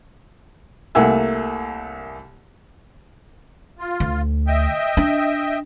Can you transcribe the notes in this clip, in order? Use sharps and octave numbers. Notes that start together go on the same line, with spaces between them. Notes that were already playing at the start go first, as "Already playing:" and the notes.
C2 A3 A#3 F#5 G#5 E6
F4
D2
D#5 E5 G5
D4